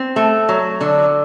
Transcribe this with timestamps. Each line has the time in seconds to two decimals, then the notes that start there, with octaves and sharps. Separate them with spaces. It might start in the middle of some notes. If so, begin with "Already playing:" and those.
Already playing: C4
0.16 A3
0.49 F#3
0.81 D3